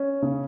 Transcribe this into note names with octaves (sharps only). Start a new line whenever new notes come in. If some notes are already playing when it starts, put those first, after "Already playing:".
Already playing: C#4
C#3